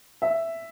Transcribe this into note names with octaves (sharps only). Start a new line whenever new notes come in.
E5